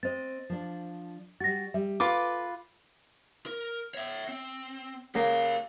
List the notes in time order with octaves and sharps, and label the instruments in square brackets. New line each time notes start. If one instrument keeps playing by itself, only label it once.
[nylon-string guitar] C4 D#5 [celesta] C5 A6
[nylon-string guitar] F3 D4
[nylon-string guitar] G3 F#4 [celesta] A6 A#6
[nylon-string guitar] G3 [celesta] E5
[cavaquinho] F4 B4 D6 [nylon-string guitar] A4
[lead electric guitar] A#4
C#5 E5
C4
[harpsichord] C#3 A#3 [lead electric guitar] G4 F5